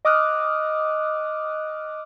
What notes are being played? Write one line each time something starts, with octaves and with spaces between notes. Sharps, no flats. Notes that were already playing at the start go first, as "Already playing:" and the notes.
D#5 D6 D#6 F6 F#6